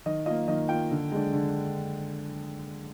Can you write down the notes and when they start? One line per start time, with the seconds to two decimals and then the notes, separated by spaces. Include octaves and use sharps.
0.06 D#3 D#5
0.26 A#3 F4 D#5
0.48 D#3 D#5
0.69 A#3 F4 G5
0.91 D3
1.12 G#3 D4
1.33 D3